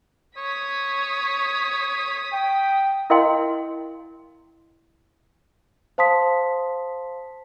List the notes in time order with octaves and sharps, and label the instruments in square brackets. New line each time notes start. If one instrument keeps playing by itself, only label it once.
[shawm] C#5 [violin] D#6 B6
[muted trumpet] G5
[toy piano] E4 A#4 D#5 F5 G5 C6
[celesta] C5 F5 A5 C6 D#6 B6